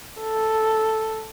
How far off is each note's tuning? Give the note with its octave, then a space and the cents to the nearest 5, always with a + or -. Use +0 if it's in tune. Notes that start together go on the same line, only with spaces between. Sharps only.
A4 +0